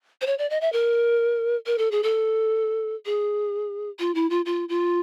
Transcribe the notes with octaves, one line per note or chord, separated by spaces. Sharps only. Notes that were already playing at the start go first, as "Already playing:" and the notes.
C5
C#5
D5
D#5
E5
A#4
A#4
A4
G#4
A4
G#4
F4
E4
F4
F4
F4